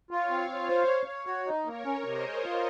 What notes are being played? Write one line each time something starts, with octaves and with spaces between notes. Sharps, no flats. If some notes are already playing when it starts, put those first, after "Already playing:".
F4 C#5 F5
C4
F4
C5
C#5
C#5
F#4
D#4
A#3 A#4 C#5
C#4
C3 C5 D#5
G#3
F4